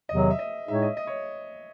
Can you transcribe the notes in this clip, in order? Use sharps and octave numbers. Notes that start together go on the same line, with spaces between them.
E2 C3 D#3 F#3 D#5
E5
D#5
A2 G#3 D#4 G#4 C#5 E5
D#5
D#5
C#5